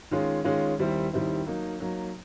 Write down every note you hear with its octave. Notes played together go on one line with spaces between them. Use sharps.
D#3 G#3 C#4 F4
D#3 G#3 C#4 F4
D#2 D#3 G3 C4 E4
D#2 D#3 G3 C4 E4
F#3 A#3 D#4
F#3 A#3 D#4